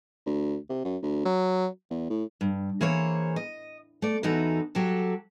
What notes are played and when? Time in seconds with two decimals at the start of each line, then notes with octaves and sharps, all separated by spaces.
0.26 D2
0.69 C3
0.85 F#2
1.03 D2
1.26 F#3
1.91 E2
2.10 A2
2.41 G2
2.81 E3 A#3 G#4 C5 C#5
3.36 D#5
4.02 A3 D5
4.23 E2 E3 D#4 F#4 A4
4.75 F#3 F#4 G4 A4